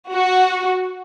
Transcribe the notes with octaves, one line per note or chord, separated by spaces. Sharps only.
F#4